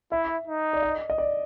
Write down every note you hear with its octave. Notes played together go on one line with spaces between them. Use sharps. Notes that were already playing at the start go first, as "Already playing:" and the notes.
E4 E5
D#4
D5
D#5
D#5
D5